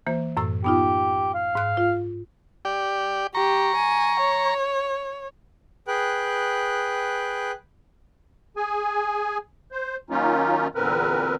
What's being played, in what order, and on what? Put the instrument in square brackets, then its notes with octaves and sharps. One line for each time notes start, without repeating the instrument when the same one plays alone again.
[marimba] E3 A#3 C5
F#2 A2 E6
[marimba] B3 D#4 F4 [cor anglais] G4
[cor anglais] F5
[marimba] G#2 F#6
F4
[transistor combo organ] G4 D5
[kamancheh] G4 [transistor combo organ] A#5 C#6
[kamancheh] G#5
C#5
[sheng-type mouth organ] G#4 B4 G5 F#6
[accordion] G#4 G#5
C5
D#3 F#3 A#3 C#4 D#4 F4
E2 A#2 D3 C4 A#4 B4